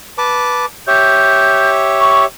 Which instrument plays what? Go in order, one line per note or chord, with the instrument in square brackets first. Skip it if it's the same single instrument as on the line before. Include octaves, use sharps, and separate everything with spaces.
[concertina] B4 A5 D6
[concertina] G4 C#5 E5 [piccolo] G6
[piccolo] C#6